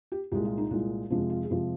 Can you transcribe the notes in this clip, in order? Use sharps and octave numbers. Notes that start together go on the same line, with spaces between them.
G4
C2 A#2 G#3 G4
F4
D#4
C2 A#2 G#3
F2 C3 F3 G#3 D4
F4
G#4
F2 C3 F3 G#3 G4